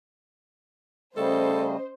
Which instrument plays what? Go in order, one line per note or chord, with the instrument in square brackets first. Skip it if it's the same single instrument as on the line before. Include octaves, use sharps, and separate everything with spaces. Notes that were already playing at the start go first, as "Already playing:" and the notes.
[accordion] C#3 G3 A3 [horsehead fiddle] C#4 D#5 [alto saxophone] A4 [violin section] C5